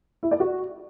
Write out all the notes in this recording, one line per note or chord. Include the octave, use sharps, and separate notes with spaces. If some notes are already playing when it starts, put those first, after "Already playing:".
E4
D5
F#4